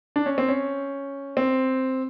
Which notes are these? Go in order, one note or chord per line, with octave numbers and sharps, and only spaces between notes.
D4
C#4
C4
C#4
C4